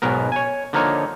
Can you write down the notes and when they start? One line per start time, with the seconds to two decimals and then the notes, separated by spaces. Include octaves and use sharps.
0.02 B1 G#2 B2 B3 A#4
0.32 C#5 G#5
0.73 D3 F3 A#3 D#4 C#5